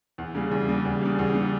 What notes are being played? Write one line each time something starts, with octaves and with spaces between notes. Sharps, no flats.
E2
C#3 G3
E2
C#3 G3
E2
C#3 G3
E2
C#3 G3